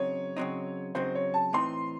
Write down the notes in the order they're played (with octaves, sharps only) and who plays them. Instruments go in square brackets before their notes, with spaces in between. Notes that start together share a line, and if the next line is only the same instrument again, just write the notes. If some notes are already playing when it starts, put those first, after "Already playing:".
Already playing: [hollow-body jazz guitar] C#3 F#3 C4 D#4 [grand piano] C#5
[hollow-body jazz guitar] C#3 F#3 C4 D#4
[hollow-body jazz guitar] C#3 F#3 C4 D#4 [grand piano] C5
[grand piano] C#5
A5
[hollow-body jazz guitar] A2 E3 C4 D#4 [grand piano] C6